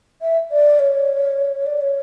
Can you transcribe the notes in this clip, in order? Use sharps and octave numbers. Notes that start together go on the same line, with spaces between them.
E5
D5
C#5
D5
C#5